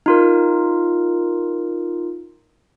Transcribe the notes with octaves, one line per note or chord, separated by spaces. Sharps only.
D#4 F4 A#4